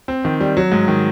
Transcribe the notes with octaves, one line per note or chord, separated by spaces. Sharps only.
C4
D#3
G3
F#3
G#2
D#3